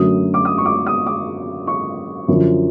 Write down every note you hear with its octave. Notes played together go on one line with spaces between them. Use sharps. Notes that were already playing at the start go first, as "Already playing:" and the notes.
Already playing: F#2 D3 F#3 A3 D#6
D6
D#6
C#6
D6
D#6
D6
C#6
F#2 D3 F3